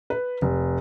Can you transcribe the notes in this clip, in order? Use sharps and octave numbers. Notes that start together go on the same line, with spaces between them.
B4
F1